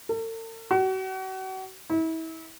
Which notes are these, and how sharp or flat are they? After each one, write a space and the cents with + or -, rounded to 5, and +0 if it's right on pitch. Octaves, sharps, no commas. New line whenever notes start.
A4 +45
F#4 +35
E4 -35